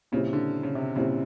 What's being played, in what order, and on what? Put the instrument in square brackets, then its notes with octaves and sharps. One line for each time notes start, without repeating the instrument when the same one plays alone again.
[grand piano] A#2 G3 C4 E4 [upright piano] C#3
[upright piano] D3
C#3
C3
[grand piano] A#2 G3 C4 E4 [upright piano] C#3